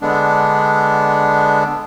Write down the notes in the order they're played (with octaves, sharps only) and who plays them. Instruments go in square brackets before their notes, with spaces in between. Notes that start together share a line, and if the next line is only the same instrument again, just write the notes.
[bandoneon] D3 G#3 B3 D4